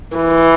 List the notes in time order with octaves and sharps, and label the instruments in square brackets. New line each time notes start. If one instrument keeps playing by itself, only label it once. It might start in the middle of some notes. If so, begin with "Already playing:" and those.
[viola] E3